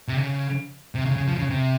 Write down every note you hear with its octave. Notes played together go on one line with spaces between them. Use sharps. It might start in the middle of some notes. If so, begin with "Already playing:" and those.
C3
C#3
C3
C#3
C#3
F3
C#3
C3